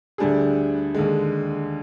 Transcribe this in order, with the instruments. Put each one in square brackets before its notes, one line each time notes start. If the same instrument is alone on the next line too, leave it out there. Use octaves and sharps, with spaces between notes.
[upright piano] D2 D3 G3 D4 G#4
D#2 D3 G#3